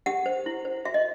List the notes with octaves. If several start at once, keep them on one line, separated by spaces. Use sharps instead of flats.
G4 F#5
C5
E4
C5
F#4 E5
D#5